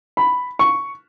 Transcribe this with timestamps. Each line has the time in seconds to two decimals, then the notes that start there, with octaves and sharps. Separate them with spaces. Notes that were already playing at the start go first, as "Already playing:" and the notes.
0.17 B5
0.59 C#6